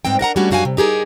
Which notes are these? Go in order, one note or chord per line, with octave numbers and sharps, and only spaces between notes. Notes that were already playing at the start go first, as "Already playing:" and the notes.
G#2 G3 B3 C4 G5
D4 A#4 F#5 A#5
G3 A3 C#4 D4 E4 F#4
F#2 D4 F#4 F5 G5 G#5
C3
D#4 G4 G#4 A#4